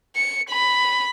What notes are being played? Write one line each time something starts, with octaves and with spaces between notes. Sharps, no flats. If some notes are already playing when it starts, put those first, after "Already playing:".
C#7
B5